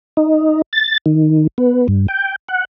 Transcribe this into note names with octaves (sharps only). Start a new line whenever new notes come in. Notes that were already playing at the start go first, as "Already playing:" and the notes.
D#4
A6
D#3
B3
G2
G5
F#5